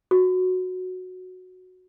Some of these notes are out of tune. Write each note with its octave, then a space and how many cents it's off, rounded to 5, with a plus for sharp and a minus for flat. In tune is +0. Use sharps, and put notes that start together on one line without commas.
F#4 -10